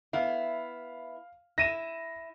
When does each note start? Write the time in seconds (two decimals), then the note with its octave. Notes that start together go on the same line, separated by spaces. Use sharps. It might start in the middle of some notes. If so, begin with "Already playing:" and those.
0.13 B3 E4 F5
1.58 E4 A#6 D#7 E7